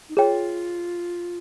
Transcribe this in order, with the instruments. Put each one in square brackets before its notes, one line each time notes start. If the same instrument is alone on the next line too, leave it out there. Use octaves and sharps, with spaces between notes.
[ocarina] D#4
[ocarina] F4 [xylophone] G#4 C#5 G5